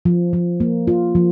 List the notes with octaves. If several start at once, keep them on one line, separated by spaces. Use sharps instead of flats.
F3
F3
A#3
F4
F3